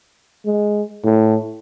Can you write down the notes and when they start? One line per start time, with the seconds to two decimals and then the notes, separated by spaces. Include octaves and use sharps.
0.46 G#3
1.04 A2